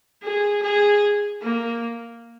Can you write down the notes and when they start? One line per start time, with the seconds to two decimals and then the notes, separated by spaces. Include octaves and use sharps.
0.23 G#4
0.63 G#4
1.42 A#3